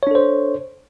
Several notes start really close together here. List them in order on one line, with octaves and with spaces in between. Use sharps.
C#5 D4 A4 C5